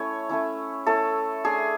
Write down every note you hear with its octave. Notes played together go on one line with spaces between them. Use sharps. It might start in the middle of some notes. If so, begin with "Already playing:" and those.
Already playing: A3 C#4 E4 C#5
A3 C#4 E4
A3 C#4 E4 A4
A3 D4 G#4